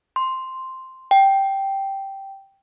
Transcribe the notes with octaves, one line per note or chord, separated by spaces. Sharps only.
C6
G5